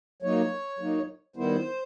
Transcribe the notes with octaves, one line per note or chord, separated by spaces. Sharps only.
F#3 A#3 D#4 C#5
F#3 A#3 D#4
D#3 G3 B3 E4 C5